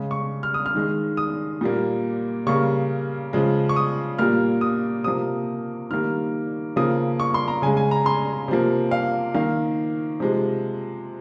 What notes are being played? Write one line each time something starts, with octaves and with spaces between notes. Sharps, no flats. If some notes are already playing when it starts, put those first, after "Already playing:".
Already playing: C#3 G#3
C#6
F6
D#6
F6
D#3 G#3
D#6
A#2 G3 A#3
C#3 G3 A#3 C#6
C#3 F3 G#3
C#6
D#6
A#2 G3 A#3 F6
D#6
C3 F3 A#3 D#6
D#3 G3 A#3 F6
C#3 F3 A#3 D#6
C#6
C6
A#5
C#3 G#3 G#5
G#5
A#5
C6
C3 F3 A#3
F5
D#3 A#3 F5
C3 F3 G#3